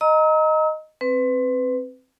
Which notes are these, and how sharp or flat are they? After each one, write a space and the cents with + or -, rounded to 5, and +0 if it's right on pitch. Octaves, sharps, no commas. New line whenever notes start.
D#5 +0 A#5 +0 E6 -45
C4 +10 B4 +25